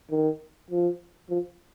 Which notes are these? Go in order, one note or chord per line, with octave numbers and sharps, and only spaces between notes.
D#3
F3
F3